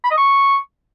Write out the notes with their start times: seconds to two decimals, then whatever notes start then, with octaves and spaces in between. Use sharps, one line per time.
0.04 B5
0.11 D#5
0.18 C#6